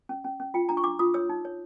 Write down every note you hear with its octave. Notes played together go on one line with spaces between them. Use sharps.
C#4
C#4
C#4
F4 G5
D4 A#5
C#6
D4 D6
F4 D#6
C#5 E6
D#4
C#5